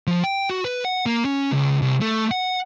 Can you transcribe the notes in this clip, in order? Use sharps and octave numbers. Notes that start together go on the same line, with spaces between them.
F3
G5
F#4
B4
F#5
A#3
C#4
C#2
C2
A3
F#5